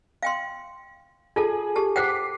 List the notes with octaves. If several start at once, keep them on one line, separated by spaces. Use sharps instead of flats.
F5 G5 C6
F4 G#4 A4 A5
G4 A4 A5
C5 F#5 G5 D6 B6 C7